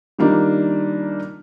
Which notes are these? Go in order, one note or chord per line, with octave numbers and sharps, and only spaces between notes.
D#3 G3 A#3 D4 D#4 F4